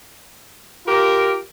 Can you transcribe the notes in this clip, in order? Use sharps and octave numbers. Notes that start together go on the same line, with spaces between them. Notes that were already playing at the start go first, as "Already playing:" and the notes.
F4 G4 A#4